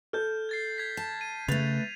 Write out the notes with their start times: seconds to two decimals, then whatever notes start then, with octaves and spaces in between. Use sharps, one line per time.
0.13 A4 F6 G6
0.49 G#6 A6 C7
0.78 G#6 B6
0.97 A5
1.21 D#7
1.48 C#3 A3 B4 A6 F7